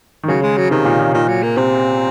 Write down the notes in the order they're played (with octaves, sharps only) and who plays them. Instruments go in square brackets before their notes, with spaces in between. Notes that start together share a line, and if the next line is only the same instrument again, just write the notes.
[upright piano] D#3
[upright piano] C#3 [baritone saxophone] F#3
[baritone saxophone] G#3
F#3
[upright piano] C3 [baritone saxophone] D#3
[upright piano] A#2
A#2
[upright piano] A#2 [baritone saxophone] D#3
[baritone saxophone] F#3
A#3
[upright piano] C3 [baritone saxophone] C4